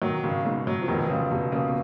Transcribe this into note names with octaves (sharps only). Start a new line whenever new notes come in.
B2 D#3 F#3
G#1 C#3
G#2 B2
F#3
F3
F1 B2 D#3
C#3 F3
F1 B2
C#3 A#3
B2